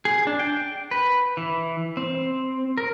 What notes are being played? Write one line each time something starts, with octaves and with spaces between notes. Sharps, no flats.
G#4
D4
G5
B4
E3
C4
A#4